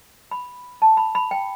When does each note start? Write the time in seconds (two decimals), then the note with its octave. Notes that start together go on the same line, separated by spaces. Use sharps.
0.31 B5
0.82 A5
0.97 B5
1.15 B5
1.31 G5